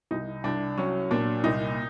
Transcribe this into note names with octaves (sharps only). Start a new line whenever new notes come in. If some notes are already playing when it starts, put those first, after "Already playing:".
C2 D#4
C2 D4
F#3 C#4
A#2 D4
C2 D#4